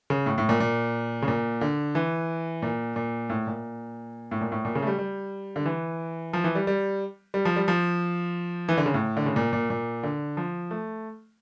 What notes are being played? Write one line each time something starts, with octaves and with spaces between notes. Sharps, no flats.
C#3
A2
A2
A#2
A#2
C#3
A#2
D3
E3
A#2
A#2
A2
A#2
A2
A#2
A2
A#2
C#3
A3
G3
G3
D3
E3
F3
E3
G3
G3
G3
F3
G3
F3
E3
D3
C#3
A2
D3
C#3
A#2
A#2
A#2
D3
F3
A3